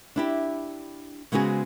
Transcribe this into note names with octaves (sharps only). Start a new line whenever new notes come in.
D4 E4 G4
C#3 G#3 B3 C4 F#4 G#4